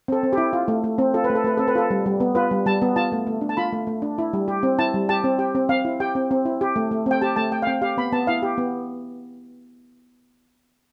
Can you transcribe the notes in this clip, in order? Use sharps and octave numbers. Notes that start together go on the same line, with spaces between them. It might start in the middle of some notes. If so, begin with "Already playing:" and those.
C4 A4
C4
E4 G4
F4
A3
A3
C4
F4 A4
B4
A3
A4
A3 B4
C4 A4
B4
F4 A4
G3
G3
B3
F4 B4
G3
G3 A5
B3
F4 A5
A3
A3
D4
A5
F4 B5
A3
A3
D4
E4
G3
G4
C4
E4 A5
G3
G4 A5
C4
G4 G5
C4
C4 F5
E4
G4 G5
C4
C4
E4
G4
A3
A3
C4 G5
G4 A5
A3 A5
A3 G5
F5
C4 G5
G4 F5
B3 B5
B3 A5
E4 F5
G4
B3